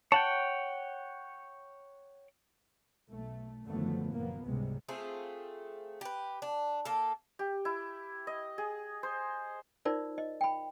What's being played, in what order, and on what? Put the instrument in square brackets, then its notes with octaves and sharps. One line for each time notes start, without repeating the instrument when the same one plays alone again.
[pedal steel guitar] C#5 F#5 G5 [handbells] A5
[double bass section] B1 A3
F#2 D3 D#3 F3 A3 B3
F#1 A#2 F3 A#3 B3
C#2 G#2 C3 G3 G#3
[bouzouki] A3 C4 F4 G#4
G4 B4
D4
A#3 A4
[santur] G4
E4
D#5
G#4
C5
[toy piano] D#4 F4 A#4 C5 D5
D#5
G5 B5